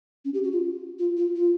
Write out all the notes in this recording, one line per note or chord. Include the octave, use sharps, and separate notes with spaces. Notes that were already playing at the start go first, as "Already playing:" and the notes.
C#4
G4
F#4
F4
F4
F4
F4